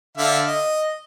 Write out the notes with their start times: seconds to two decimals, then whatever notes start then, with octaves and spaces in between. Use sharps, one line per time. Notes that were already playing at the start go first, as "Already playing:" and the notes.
0.17 D3 E5 F5
0.47 D#5